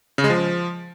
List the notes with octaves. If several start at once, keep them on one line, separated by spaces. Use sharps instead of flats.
C#3
G#3
F3